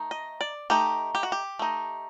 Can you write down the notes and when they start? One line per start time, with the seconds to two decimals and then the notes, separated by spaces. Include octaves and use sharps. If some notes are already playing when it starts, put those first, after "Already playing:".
Already playing: A3 D#4
0.11 D#5
0.41 D5
0.70 A3 D#4 G4
1.15 G4
1.23 F#4
1.32 G4
1.59 A3 D#4